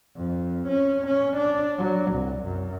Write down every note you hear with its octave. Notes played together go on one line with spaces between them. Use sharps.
F2
C#4
C#4
D4
F#3
C2
F#2